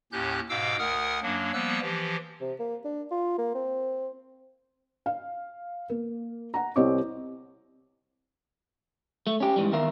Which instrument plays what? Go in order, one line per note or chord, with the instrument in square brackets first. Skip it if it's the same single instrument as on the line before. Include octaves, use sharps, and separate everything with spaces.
[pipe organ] D#2 A2 C#4 G4 F#6 G6
G#2 B2 F5 G5 D6 E6
D2 A#4 F#5 D#6 F6
F#2 F#3 A#3 D4
F3 G3 A#3 B3 E6 F#6
E3 F3 G4
[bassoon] C3
A#3
D4
F4
A#3
C4
[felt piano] F5
A#3
F#5 A#5
C2 G3 C4 C#5 D#5 D6
[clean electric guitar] A3
C#4 G4
G#2 E3 G3
E2 D#3 A#4 E5 F5